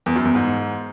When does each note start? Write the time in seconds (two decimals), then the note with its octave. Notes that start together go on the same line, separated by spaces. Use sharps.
0.06 E2
0.16 F#2
0.25 E2
0.35 G#2